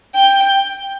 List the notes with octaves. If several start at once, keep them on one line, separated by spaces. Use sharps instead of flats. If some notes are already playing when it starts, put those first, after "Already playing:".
G5